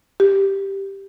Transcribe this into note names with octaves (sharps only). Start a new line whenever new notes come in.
G4